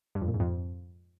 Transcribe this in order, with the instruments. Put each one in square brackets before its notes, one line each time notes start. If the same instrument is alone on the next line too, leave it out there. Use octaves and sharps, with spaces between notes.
[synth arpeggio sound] G2
F2
A#2
G#2
F2